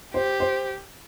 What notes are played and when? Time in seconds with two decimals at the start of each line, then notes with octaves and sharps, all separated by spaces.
0.14 G4 C5
0.40 C5